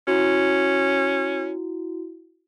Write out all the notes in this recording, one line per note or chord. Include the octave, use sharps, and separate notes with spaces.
C#4 E4 F#4